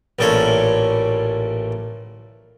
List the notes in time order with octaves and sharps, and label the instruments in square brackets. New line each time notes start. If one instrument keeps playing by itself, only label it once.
[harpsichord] A1 A#2 A4 C#5 B5